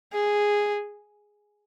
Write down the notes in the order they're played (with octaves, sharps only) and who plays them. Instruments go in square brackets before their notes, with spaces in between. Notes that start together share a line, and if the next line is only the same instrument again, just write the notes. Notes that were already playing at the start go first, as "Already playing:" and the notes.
[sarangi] G#4